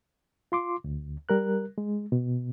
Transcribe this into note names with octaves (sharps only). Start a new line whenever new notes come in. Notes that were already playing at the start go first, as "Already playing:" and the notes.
F4 C6 D6
D2
G3 A#4 F#6
G#3
B2